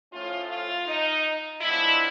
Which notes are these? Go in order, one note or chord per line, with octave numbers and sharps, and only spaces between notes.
A2 F3 A3 C#4 F4
F4
D#4
A2 F3 G#3 B3 D4 E4